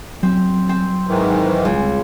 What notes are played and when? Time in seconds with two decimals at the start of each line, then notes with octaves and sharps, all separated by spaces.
0.23 F#3 C4
0.69 C4
1.07 G#2 D#3 E3
1.65 C#2